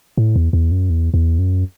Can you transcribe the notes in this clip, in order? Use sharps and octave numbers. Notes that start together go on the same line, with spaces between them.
A2
E2
E2
F#2
E2
E2
F#2